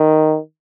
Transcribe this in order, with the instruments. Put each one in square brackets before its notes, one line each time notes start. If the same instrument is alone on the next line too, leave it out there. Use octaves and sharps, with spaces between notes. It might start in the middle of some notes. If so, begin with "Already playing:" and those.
Already playing: [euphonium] D#3